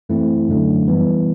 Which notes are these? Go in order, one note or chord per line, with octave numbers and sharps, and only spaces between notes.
F#2 E3 A3 C4 E4
F#2 D3 F#3 A3 D4
E3 G3 B3